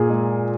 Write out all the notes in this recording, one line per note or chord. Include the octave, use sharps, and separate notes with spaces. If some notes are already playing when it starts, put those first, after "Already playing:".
Already playing: A#2 G#4
G#3